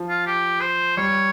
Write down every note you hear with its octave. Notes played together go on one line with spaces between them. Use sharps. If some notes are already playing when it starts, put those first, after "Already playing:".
Already playing: F3
F4
G4
C5
G3 C#5